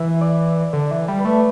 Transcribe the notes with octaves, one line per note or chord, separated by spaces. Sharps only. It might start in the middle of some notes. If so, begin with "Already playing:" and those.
Already playing: E3 E5
D5
D3
E3
G3
B4
A3 D5